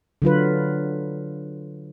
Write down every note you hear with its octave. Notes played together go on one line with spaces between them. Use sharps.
D3 F#3 F4 B4